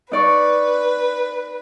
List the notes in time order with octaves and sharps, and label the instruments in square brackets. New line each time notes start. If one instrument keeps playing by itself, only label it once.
[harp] D#4 D5 C#6 [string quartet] B4